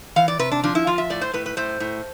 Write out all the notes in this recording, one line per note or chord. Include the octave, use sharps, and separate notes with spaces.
E3 F5
D5
C3 B4
D4
F3 D4
E4
F3 F4
E5
A2 D5
C5
A2 B4
B4
A2 C5
A2